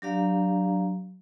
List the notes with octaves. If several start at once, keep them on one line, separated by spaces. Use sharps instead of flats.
F#3 D4 G4 D5 F5 A#5